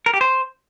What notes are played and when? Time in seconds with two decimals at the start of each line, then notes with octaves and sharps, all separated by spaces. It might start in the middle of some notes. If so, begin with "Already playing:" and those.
0.06 A#4
0.14 G4
0.21 C5